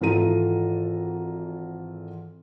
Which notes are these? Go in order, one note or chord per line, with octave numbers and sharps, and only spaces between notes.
G#1 E3 F4 A4 A#5 D#7